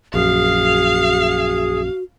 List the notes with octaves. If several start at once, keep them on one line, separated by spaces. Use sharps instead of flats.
A#1 F#2 F#4 G#4 F5